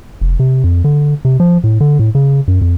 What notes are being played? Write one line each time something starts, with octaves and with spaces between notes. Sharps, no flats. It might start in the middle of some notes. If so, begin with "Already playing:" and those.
F1
C3
F2
D3
C3
F3
A2
D3
A2
C#3
F#2
F2